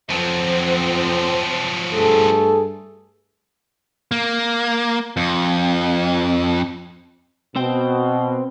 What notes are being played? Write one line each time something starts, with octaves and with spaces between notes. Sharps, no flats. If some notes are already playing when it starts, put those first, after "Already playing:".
F2 F3 F#3 C4
G2 A3 G#4 A4
A#3
F2
B2 C4 C5 G5